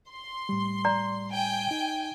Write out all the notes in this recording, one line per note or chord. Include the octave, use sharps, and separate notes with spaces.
C6
A2 G3
D5 A#5
G5 G#5
D#4